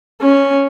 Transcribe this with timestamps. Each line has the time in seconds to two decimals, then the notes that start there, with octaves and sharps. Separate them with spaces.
0.21 C#4